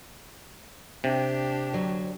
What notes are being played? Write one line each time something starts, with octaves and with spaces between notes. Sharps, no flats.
C3 D4 G4
D2 F#3